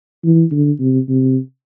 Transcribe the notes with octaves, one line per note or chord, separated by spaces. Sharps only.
E3
D3
C3
C3